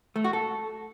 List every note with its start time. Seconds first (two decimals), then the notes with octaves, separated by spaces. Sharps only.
0.16 A3
0.24 F#4
0.33 A4